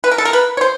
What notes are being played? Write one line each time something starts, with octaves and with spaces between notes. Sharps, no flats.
B4
A#4
A4
A#4
B4
C#5
C5